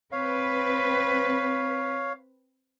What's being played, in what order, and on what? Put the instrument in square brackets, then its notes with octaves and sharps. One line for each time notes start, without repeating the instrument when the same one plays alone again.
[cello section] C4 B4 [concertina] C#5 F5